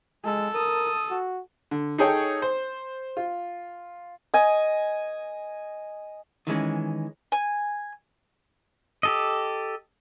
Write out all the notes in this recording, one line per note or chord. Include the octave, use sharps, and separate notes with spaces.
G#3 A4
A#4 D#6
F#4
D3
D#4 G#4 A4 C#5 G5
C5
F4
D#5 G#5
D#3 E3 G#3 C#4
G#5
G4 A4 D#5